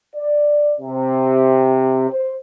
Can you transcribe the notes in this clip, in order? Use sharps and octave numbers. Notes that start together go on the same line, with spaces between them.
D5
C3
C5